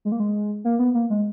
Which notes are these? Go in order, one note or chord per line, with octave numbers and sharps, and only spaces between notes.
G#3
A#3
G#3
A#3
B3
A#3
G#3